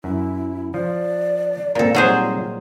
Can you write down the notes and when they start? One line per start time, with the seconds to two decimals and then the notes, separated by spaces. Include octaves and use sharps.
0.04 F#2 E4
0.74 F3 D5
1.75 A#2 A#3 C4 F4 A4 A#4
1.95 F#3 G3 C4 D#4 G#4 C5